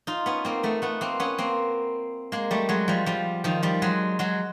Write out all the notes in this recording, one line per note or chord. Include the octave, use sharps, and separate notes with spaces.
D#4 F4
B3 C#4
A#3 C4
A3 B3
A3 B3
A#3 C4
B3 C#4
A#3 C4
G#3 A#3
G3 A3
F#3 G#3
F3 G3
F3 G3
D#3 F3
F3 G3
F#3 G#3
F#3 G#3